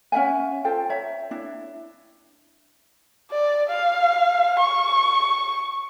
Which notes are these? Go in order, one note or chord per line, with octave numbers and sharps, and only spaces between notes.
C#4 E5 F#5 G#5
F4 A4 C5 G5
C#5 E5 A#5
D4 E4
D5
F5
C#6